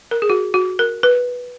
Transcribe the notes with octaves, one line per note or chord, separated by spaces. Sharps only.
A#4
G#4
F#4
F#4
A#4
B4